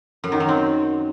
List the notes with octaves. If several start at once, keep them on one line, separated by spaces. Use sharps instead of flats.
F#2
D#3
F#3
C4